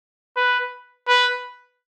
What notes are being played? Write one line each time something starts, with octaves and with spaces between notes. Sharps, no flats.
B4
B4